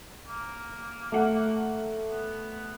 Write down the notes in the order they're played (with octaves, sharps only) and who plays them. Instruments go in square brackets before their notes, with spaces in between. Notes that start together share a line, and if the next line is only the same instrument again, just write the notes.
[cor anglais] A#3
[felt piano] A3 F#5
[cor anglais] B3